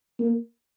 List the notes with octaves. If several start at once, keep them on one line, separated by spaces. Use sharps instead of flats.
A#3